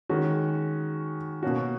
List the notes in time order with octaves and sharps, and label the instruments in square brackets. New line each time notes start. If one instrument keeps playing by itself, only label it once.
[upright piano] D#3 G#3 C#4 F#4
B2 A#3 C#4 F#4